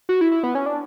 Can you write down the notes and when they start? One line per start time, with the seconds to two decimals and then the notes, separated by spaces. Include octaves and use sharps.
0.09 F#4
0.21 E4
0.32 E4
0.43 B3
0.55 C#4
0.66 D4